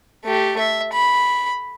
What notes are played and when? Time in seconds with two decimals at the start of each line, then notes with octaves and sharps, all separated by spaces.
0.25 A3 G4
0.59 E5
0.93 B5